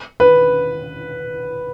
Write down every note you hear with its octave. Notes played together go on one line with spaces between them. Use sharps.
B4